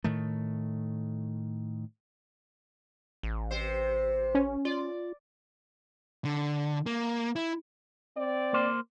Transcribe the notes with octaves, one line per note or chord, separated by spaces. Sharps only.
A2 D#3 A3
A1
C3 C5
C#4
F4 D5
D3
A#3
E4
C4 D5
A#3 C5